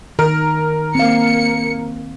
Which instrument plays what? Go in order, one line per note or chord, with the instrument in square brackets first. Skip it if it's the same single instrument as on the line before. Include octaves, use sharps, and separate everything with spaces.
[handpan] D#3 [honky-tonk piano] A#4
[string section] A#3 C#7 [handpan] C4 F5